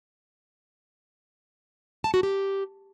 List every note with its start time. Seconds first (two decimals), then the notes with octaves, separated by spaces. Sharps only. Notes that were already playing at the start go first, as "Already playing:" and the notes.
2.04 A5
2.14 F#4
2.23 G4